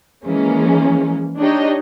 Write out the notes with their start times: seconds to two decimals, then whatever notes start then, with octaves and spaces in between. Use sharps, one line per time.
0.25 E3 F3 G#3 A#3 C#4
1.38 D4 D#4 G4 C#5 D#5